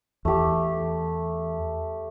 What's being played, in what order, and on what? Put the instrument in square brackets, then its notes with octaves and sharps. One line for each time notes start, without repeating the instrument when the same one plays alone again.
[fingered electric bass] E2 [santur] A3 G4